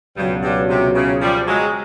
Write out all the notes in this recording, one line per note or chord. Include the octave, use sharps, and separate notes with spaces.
C#2 G2 B2 F#3
G2
C3
C#3
F3 G3
F#3 G#3